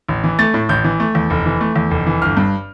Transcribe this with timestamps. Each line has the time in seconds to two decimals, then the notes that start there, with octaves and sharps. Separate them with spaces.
0.08 A1
0.24 E3
0.39 A3 A6
0.54 A2
0.69 A1 G6
0.84 E3
1.00 A3
1.15 E2
1.30 F1
1.46 E3
1.61 A3
1.76 E2
1.91 F1
2.07 E3
2.22 G1 F6
2.37 G2